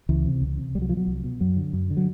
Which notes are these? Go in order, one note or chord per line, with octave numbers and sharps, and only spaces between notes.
C#2 E3
C3
C#2
C3
C2 G3
F#3
B2 F3
F#3
C2
B2
F#2 F#3
D3
F#2
D3
F#3